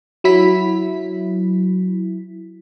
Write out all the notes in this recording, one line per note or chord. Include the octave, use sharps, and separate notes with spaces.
F#3 E4 B6